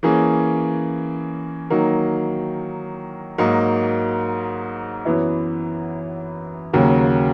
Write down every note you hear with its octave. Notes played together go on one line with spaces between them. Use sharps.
E3 A#3 C#4 G#4
D#3 F#3 A#3 D#4 A#4
G#2 F#3 A#3 D#4 A#4
F#2 E3 B3 E4
D#2 C#3 F#3 A#3